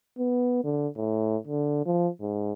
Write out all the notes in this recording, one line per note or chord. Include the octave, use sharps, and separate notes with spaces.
B3
D3
A2
D3
F3
G#2